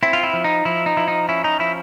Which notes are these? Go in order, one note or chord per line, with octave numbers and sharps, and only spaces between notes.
C4 E4
F4
E4
F3
D#4
F3 E4
D#4
F3 E4
D#4
C#4 E4
D#4
F3 E4